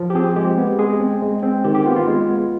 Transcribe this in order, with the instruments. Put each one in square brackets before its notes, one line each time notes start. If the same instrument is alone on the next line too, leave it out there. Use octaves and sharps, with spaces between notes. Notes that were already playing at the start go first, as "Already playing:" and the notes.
Already playing: [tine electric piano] F3
G4
C4 G#4
G#3 G4
B3
G#3 G#4
C4
G#3
C4
D#3 G4
G4
B3 F4
F4
G#3
B3